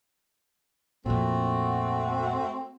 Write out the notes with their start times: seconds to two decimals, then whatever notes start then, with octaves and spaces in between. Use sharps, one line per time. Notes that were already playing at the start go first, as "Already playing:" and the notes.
1.06 F2 A#2 A3 C4 F#4